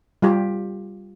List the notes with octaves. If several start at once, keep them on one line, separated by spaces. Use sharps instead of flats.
G3 F4 G4